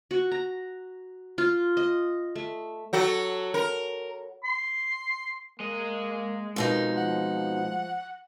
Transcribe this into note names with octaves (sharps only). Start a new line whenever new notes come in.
F#4
A#5
F4
D#5
A3
F#3 F#4 A4
A#4
C6
G#3 A#3 D#5
F2 B2 D#4 A#4
F3 F#5